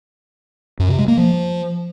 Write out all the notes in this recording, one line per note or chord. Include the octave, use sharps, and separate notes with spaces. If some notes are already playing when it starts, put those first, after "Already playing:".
F#2
C3
G#3
A#3
F3